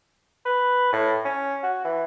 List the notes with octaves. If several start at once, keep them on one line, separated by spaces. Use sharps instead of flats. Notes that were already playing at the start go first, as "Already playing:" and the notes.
B4
A2
C#4
F#4
E3